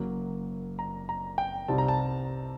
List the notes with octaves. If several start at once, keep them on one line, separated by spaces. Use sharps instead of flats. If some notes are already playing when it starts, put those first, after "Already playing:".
Already playing: F#1 F#2 F#3 A#3
A#5
A#5
G5
C2 C3 G3 C4 D#4 A5
A#5
A5